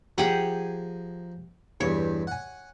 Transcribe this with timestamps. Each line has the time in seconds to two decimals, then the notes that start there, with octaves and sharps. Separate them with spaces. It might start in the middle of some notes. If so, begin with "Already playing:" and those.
0.18 F3 G4 G#4 A#4 F#5
1.80 E2 G2 E3 C#5
2.27 F#5 G#5